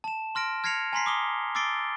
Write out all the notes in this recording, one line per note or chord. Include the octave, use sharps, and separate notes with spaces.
A5 E7
C6 F6 A#6 D7
F6 G#6 A#6 C7 C#7 F7
G#5 A#5 C6 B6 C7
D6 D#6 G7
D6 E6 A6 C7 D7 G7